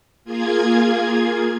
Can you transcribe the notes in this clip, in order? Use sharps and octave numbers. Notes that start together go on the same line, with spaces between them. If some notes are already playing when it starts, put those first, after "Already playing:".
A#3 F4 G#4 G#6